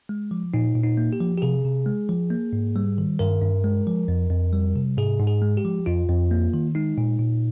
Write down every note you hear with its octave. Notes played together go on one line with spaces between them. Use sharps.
G#3
F3
A#2 D#4
A#2
D#4
A#3
G4
F3
G4
C3 G#4
C3
G#3
F3
A#3
G#2
G3
D#3
G2 A#4
G2
G#3
F3
F2
F2
G3
C3
G#2 G#4
G#2
G#4
G#3
G4
F3
F2 F4
F2
A#3
D#3
G#3 D#4
A#2
A#2